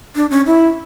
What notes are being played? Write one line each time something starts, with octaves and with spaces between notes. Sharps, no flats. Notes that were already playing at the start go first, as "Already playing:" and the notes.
D4
C#4
E4